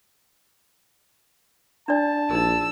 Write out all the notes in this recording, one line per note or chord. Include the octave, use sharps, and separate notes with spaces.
D4 D5 A5
A#1 D#4 G#4 E6